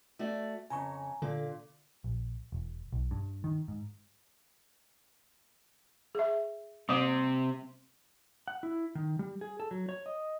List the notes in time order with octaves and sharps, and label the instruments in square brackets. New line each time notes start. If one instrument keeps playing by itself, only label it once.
[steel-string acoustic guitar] A3 F#4 D5
[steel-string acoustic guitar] F2 C#3 [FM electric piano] G#5 A#5 C#6
[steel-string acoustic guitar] A#2 [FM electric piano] D3 A4
[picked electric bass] A#1
E1
B1
G2
D#3
G#2
[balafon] G#4 E5
[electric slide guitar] C3 C4 [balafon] G3 A#3 D6
[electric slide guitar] F#5
E4
D#3
G3
G#4
A4
F#3
C#5
D#5